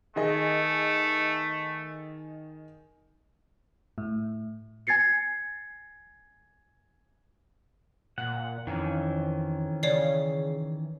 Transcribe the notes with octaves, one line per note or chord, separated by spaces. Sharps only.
D#3 A3 G#4 D#5
A2
G#5 G#6 A6 C7 C#7
A#2 F#5
F2 D#3 E3 C#4
C#3 C#5 D5 C7